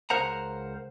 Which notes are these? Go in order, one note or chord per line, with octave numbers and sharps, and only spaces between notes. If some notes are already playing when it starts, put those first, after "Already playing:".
C#2 A#4 C5 F#5 A#5